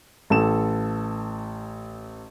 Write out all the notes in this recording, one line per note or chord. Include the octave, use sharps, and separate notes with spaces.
A1 A4 E7